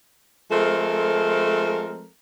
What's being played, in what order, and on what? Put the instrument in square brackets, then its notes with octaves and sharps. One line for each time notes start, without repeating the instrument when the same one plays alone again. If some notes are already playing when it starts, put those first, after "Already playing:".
[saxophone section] F3 G#3 A3 C4 A4 A#4